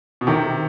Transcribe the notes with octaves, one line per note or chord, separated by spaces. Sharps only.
B2
C3 D#3